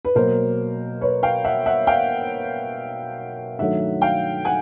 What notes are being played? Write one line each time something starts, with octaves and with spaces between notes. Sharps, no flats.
B4
B2 F#3 A#3 A#4 C5
B4 C#5
F5 G5
E5 F#5
E5 F#5
F5 G5
G2 D#3 F#3 A3 E5 F#5
F5 G5
F#5 G#5